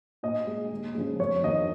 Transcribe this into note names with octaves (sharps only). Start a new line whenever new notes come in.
A#2 D#5
G#3
D#2
C#3 F3 G#3
F2 C#5
D#3 A#3 D#5